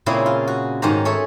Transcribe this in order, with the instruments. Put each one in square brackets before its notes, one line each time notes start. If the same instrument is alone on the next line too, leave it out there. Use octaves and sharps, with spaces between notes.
[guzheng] A#2 C#3 C4 C#4 E4 G#4
F4
F#4
G#2 D#3 C#4 G4 C5 A#5
G#4 A4 C#5 E5